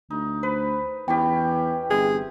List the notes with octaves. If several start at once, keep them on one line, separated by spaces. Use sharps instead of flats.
D2 D#4
B4 C5
E2 E3 C#4 G4 G5
G1 C3 G#4